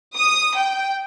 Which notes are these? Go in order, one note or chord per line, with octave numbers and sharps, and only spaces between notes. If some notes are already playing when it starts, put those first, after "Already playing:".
D#6
G5